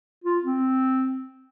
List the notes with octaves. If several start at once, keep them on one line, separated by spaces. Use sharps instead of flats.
F4
C4